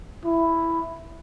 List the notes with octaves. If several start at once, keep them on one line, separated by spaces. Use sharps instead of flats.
E4